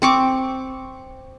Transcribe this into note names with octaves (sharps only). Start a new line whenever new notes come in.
C4 C#6 D6